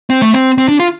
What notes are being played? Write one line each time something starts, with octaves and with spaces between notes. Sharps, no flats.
C4
A3
C4
C4
D4
F4